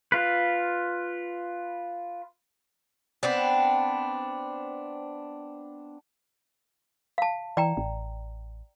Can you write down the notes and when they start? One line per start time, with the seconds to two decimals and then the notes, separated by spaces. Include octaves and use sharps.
0.12 F4 B4
3.23 B3 C4 D4
7.18 F5 A5
7.57 E3 D5 G5 A#5
7.77 A1